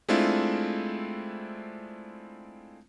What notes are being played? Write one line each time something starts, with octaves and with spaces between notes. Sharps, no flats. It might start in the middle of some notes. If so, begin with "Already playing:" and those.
G#3 A3 C4 D4 E4 F4